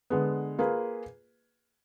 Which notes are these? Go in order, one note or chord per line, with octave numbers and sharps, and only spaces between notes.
D3 G#3 B3
A#3 F4 G#4 B4